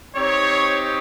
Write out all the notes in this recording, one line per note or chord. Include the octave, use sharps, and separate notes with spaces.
C4 D#4 G4 C#5